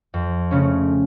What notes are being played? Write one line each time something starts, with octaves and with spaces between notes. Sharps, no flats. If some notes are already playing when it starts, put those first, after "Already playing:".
F2
C#3 A3 C#4